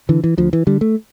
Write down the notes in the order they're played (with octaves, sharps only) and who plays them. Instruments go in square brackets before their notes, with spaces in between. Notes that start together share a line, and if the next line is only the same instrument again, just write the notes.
[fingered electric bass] D3 E3
E3
D2 F3
E3
D3 G3
A3